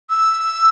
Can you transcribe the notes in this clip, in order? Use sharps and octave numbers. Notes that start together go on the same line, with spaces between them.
E6